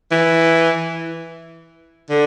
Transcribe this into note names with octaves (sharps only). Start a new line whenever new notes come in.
E3
D3